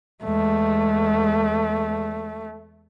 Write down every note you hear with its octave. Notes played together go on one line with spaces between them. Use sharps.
E2 G#3 A3